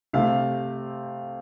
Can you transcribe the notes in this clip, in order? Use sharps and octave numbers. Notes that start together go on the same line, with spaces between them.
C3 A3 C4 F5